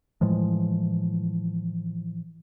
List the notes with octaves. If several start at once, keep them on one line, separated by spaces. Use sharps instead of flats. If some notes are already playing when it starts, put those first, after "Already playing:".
A2 E3 F3 G#3